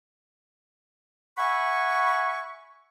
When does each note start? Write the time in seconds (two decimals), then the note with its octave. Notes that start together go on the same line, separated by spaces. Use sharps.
1.38 E5 F#5 G#5 B5 C#6